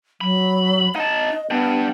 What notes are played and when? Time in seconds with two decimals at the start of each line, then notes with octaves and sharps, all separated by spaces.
0.21 F#3 B5
0.96 D#4 D#5 A5
1.51 G3 B3 D4